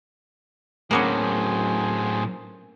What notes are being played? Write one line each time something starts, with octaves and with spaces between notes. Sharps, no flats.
A2 F#3 A#3 B3 C#4 G#4 C5 G#5